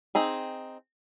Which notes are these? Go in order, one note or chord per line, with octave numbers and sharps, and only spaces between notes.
C4 D#4 G#4